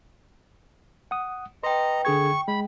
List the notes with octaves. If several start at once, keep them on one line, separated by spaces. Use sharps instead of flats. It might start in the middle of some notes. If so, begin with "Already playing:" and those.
F#5 D#6
B4 D#5 G5 A#5 C6
D3 G#4 G5 C#6 G#6
G#3 B5